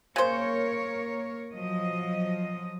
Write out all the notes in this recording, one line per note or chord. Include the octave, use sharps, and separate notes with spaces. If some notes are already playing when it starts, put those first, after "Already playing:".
C#3 A#3 A#4 C5 C#5
F3 F#3 D#5